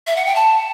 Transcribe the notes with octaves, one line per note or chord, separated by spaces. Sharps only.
E5
F#5
G5
A5